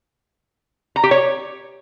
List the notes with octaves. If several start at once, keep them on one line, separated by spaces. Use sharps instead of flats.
A#5
G4
C#5